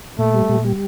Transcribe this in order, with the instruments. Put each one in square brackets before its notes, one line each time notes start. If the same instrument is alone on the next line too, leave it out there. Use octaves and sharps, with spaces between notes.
[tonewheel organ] A#2 [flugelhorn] A3
[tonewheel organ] G3
A#2
G3